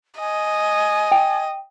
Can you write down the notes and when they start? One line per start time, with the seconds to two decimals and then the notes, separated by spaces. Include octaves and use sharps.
0.19 D#5 G#5
1.12 G5